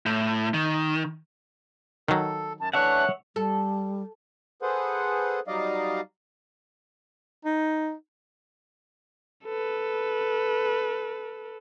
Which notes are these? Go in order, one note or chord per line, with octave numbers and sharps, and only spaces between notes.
A2
D#3
D#3 F#3 A4
F#2 A5
E3 A3 D4 C#5 E5 F#5 F#6
G3 A4
G#4 A4 B4 C5 F#5
F#3 G3 D#4 D5 D#5 F5
D#4
A4 B4